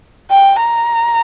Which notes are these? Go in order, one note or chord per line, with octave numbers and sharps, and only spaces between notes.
G5
A#5